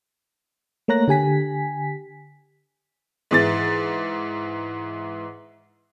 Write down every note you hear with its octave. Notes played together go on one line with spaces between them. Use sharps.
A3 A#3 C#5 A#5 F#6 A#6
D3 G4 G#5 B6
G#2 E3 A6